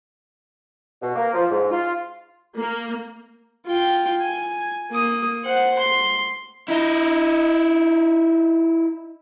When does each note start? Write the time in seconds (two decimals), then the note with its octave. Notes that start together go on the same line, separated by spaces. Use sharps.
1.02 B2
1.15 A#3
1.34 F3
1.51 G#2
1.71 F4
2.58 A#3
3.66 F4 G5
4.20 G#5
4.92 A#3 D#6
5.45 C5 F#5
5.79 C6
6.68 D#4 E4